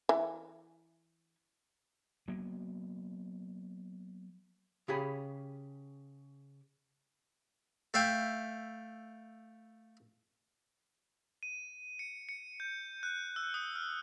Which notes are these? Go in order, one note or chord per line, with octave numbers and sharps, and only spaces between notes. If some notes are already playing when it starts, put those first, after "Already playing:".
E3
F#3 A#3 B3
C#3 G4 G#4 B5
A3 E5 F5 G5
D#7
C#7
C#7
G6
F#6
E6
D#6
F6